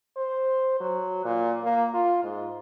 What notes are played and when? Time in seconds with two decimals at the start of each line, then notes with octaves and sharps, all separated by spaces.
0.17 C5
0.80 F#3
1.25 A#2
1.65 A#3
1.94 F4
2.23 G#2